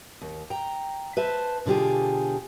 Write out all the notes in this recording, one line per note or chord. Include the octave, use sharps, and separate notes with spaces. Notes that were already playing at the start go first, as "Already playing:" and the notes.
D#2
G5 A#5
B4 C5 E5 A5
B2 D3 F4 G4 G#4